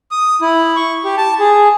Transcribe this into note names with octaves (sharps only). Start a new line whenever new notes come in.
D#6
E4
C#6
G4
A5
G#4